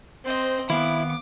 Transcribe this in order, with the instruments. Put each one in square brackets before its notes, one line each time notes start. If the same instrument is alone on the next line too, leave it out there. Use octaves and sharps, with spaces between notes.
[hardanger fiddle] C4 D#5 [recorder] C5
[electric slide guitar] D#3 F5 [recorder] B3 [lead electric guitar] E4 [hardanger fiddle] D6